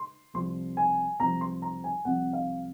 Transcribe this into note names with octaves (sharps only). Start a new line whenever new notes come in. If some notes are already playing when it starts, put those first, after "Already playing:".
Already playing: C6
C2 C3 F3 C6
G#5
C2 C3 F3 A#5
C6
A#5
G#5
C2 C3 F3 F#5
F5